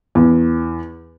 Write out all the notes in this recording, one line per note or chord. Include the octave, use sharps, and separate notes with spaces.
E2